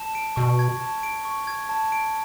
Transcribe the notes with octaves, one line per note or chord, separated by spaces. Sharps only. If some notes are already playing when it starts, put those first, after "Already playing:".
Already playing: A5
D7
B2 C#6
G#6
A5
D7
C#6
G#6
A5
D7